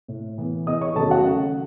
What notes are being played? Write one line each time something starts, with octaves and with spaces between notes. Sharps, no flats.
A2
E3 B3
E2 D#5 D#6
C#5 C#6
D#3 F#3 A3 C#4 A4 A5
F#4 F#5
C#3